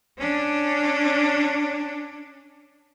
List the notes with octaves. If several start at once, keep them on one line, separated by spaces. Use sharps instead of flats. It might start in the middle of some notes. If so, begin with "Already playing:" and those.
C#4 D4